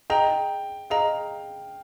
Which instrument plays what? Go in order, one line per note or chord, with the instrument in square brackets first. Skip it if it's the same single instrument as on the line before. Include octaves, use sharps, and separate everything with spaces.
[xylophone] G#4 D#5 A#5 [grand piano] G5
[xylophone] G#4 D#5 A#5 [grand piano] F5